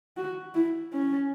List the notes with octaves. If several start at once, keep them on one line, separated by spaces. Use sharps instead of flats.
F#4
E4
C#4